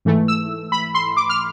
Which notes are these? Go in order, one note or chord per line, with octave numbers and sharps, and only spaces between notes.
G#2 E3 A3
E6
B5
C6
D6
F6